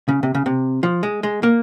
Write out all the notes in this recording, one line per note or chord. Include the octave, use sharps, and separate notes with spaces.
C#3
C3
C#3
C3
F3
G#3
G#3
A#3